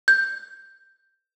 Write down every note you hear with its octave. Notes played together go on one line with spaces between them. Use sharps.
G6